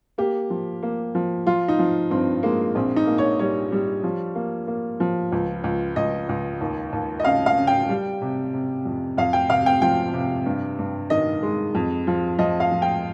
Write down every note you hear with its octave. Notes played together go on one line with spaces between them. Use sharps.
A#3 G4
F3
A#3
F3
F3 F4
D#4
F3
G2 C4
G#3 A#3
A#1 C4
D#4
A#3
C#5
G3 C#5
G3
F3
A#3
A#3
F3
C#2
C#2
C#2 D#5
C#2
D#2
D#2
D#5
C#3 F5
F5
C#3
G5
G3
C3
C3
F2
F2 F5
G5
C3 F5
G5
F3 G5
C3
G2
G2
D#3 D#5
G#3
F2
F3
F3 D#5
F5
F3
G5